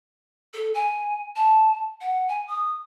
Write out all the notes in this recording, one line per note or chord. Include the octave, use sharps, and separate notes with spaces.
A4
G#5
A5
F#5
G#5
D#6